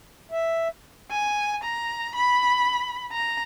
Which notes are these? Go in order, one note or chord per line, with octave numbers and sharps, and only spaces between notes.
E5
G#5
A#5
B5
A#5